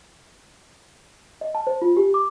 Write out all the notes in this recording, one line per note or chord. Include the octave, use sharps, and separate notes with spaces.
D#5
A5
C5
F4
G4
D6